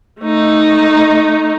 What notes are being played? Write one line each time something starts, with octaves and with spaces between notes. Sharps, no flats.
A3 D#4